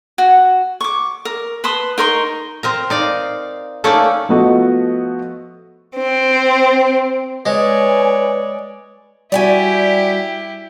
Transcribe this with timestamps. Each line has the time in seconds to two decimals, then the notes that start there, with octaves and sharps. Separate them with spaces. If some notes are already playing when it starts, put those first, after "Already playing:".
0.18 F#4
0.81 C#6 D6
1.25 A#4
1.64 B4 A5 C6 D#6
1.98 D#4 A#4 C6 C#6
2.63 C4 A#4 A#5
2.90 D#4 D5 F5
3.84 A3 A#3 C#4 D#4 A4 D5
4.29 F3 A3 B3 F#4 D#5
5.96 C4
7.46 G#3 B4 C#5 D5 G#5
9.32 G3 E4 F#4 G4 D5 G5 G#5